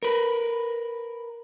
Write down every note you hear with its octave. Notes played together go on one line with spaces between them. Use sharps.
A#4 B4